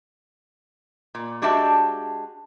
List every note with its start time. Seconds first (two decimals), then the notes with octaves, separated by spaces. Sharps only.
1.15 A#2
1.42 G#3 D4 F#4 G4 E5 A5